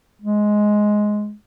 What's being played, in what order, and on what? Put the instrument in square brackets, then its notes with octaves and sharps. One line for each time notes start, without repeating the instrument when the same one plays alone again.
[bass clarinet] G#3